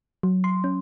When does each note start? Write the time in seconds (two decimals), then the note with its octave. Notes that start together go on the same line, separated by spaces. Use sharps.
0.23 F#3
0.44 C6
0.64 C#4